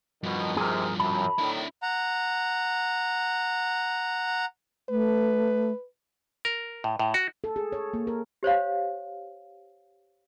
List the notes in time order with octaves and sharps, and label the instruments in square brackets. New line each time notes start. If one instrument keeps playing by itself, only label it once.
[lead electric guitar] G2 F3 [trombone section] B2 D#3
[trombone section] G#2 C3 [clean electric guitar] G#4 A#4
[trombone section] F#2 [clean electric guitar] A5 B5
[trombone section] A2 D#3 [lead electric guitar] D4 E4
[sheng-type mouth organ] F#5 A#5
[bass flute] A3 [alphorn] B4
[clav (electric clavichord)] A#4
A2
A2
F#4
[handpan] A4
G#4
C#5
A#3
A#4
[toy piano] G4 C5 C#5 F5